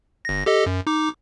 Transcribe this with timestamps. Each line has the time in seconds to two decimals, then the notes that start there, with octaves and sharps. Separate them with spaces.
0.25 G1 A#6
0.46 G4 A4 D#5
0.66 F#2
0.87 D#4 D6